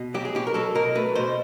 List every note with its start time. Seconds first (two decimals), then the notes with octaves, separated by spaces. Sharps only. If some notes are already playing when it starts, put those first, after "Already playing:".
Already playing: B2
0.14 F#3 G4
0.25 G#4
0.35 B2 G4
0.47 A#4
0.54 F#3 A4
0.75 B2 A#4
0.95 A3 B4
1.15 B2 C5